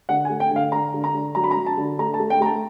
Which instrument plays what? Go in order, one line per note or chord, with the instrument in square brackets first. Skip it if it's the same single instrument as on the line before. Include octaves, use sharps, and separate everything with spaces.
[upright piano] D3 F#5
G#5
A3
G5
D3 F5
D3 A#5
D3
A#5
D3
F#3 A#5
B5
A#5
F#3
A5
D3
A3 A#5
A5
A3
G5
A3 A#5
A5